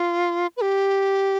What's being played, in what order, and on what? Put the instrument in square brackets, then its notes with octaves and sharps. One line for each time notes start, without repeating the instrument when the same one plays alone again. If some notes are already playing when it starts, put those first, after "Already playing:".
Already playing: [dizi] F4
B4
G4